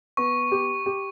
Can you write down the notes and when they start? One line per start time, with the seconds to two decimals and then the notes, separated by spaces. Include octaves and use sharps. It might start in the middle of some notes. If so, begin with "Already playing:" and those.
0.17 B3 C#6
0.51 G4
0.86 G4